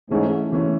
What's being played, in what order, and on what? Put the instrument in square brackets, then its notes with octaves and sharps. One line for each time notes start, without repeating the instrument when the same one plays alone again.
[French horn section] G#2 [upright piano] E3 A3 C#4
[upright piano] E3 A3 C#4